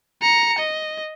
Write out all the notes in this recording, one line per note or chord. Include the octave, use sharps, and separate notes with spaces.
A#5 C#7
D#5